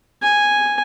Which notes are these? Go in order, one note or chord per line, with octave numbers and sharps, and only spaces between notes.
G#5